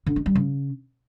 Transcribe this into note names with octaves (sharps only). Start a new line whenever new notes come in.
D3
D#4
G3
C#3